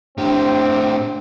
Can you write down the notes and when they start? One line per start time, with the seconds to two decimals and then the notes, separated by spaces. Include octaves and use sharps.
0.18 A2 C4 D4 G4